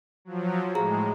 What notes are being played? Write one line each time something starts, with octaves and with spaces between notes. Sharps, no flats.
F3 F#3
A2 G#3 G#4 A#5